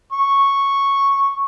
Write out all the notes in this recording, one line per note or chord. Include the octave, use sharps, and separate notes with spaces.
C#6